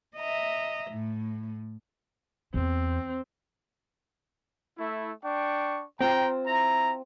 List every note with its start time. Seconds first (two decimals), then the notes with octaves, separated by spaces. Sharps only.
0.16 D#5 E5 A#5
0.90 A2
2.54 E2 C4
4.79 A3 E4
5.24 D4 G5 C#6
6.01 C4 F4 G5 A#5
6.47 E4 A#5